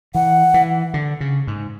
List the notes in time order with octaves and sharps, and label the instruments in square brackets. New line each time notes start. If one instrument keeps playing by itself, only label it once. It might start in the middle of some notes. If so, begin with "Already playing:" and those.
[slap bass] E3 [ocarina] F#5
[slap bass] E3
D3
C#3
G#2